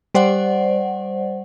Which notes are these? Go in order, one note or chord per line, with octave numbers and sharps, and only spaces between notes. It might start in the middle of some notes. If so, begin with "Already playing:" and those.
G3 C5 D5 F#5